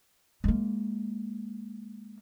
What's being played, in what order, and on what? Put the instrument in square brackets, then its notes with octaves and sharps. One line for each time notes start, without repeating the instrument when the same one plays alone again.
[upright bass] G#3 A#3